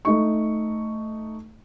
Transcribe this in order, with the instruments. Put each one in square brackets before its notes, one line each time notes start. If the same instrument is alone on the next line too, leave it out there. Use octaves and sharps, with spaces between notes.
[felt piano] A3 D#4 C#6